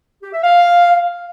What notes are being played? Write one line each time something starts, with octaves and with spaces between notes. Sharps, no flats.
G4
E5
F5